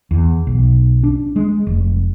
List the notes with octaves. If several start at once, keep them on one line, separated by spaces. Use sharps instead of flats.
E2
B1
D4
G#3
F1